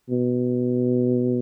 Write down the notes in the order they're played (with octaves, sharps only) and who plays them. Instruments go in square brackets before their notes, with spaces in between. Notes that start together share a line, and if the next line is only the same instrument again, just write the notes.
[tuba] B2